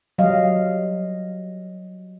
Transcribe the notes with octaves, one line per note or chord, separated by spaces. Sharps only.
F#3 G3 D#5 F5